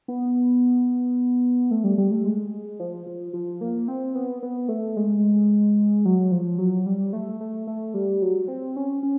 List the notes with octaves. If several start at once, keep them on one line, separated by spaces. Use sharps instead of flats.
B3
A3
G3
G3
A3
G#3
F3
F3
F3
A#3
C4
B3
B3
A3
G#3
F#3
F3
F#3
G3
A3
A3
A3
G3
F#3
C4
C#4
C#4